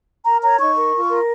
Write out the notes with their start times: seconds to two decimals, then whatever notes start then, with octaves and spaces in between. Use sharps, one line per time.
0.25 A#4 A#5
0.42 C#5 A#5
0.59 D#4 C#6
0.76 A#4
0.93 F4
1.09 A#4